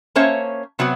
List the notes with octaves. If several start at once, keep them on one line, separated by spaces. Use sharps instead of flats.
A#3 C#4 C5 C#5 E5 A5
C3 F#3 B3 F#4